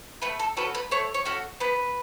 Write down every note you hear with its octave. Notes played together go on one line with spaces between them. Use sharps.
A3 B4
A4
C#4 F#4 A4 B4
B4
A3 C#5
C#5
C#4 F#4 A4
B3 B4